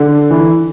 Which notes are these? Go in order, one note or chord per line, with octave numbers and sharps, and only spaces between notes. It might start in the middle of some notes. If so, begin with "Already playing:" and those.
Already playing: D3
E3